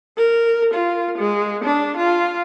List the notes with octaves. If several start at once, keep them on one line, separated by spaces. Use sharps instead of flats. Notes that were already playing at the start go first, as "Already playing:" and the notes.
A#4
F4
G#3
D4
F4